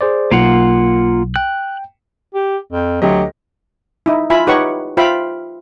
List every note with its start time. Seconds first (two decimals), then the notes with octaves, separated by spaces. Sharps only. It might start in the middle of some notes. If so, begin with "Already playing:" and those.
0.01 G#4 C5 D5
0.31 B1 A#3 F4 F#5
1.36 G5 F#6
2.34 G4
2.72 F2
3.02 D2 F#3 G4 D#5
4.06 D#4 E4
4.30 E4 F4 E5 G#5 B5
4.47 D#4 G4 B4 C#5 F#5 C#6
4.97 F4 C5 E5 F5 G5 B5